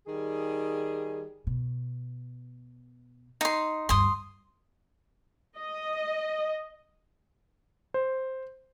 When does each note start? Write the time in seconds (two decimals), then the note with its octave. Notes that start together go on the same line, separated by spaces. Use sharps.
0.07 D#3 G3 G#4
1.47 B2
3.41 D#4 C6
3.89 D2 G2 C6 D#6
5.57 D#5
7.94 C5